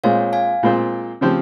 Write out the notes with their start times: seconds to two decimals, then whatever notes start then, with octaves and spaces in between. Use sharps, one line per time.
0.04 A#2 G#3 C4 F4 C5 C#5 F5
0.33 F5 G#5
0.63 A#2 G#3 C4 F4 C5
1.21 C#3 F3 C4 G4 C5